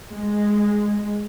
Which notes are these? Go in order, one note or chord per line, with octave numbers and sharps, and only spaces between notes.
G#3